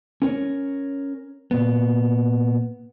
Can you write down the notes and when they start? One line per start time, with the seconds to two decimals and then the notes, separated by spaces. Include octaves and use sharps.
0.22 C#4 A#4 C#5
1.51 A#2 B3